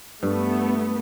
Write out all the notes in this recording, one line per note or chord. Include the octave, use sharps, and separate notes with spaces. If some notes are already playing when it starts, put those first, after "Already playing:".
G2 A3 B3